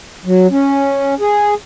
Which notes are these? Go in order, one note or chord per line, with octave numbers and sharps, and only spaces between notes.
F#3
C#4
G#4